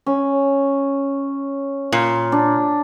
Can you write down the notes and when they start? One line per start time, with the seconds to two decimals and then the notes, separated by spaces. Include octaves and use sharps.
0.06 C#4
1.92 A#2
2.32 D4